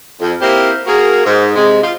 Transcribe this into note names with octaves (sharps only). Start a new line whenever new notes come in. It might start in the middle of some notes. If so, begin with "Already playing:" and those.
F2
A#3 C4 E4 G4
A#3 F#4 G#4 A#4
G#2
C3 G#3
F4